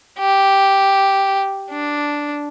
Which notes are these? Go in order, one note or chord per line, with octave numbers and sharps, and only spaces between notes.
G4
D4